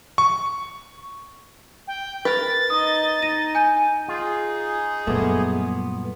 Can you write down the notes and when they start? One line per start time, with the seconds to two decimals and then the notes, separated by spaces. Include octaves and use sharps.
0.18 C#6
1.87 G5
2.25 A#4 B4 A6
2.70 D#4 D#5 D#6
3.22 D#4 A#6 D#7
3.55 G#5 G6 D#7
4.08 D#4 F4 G#4
5.07 F#2 A#2 G3 A3 B3